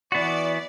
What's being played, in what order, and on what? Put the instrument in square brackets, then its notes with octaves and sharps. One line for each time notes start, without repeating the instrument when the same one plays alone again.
[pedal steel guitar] E3 B3 F#4 [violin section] D5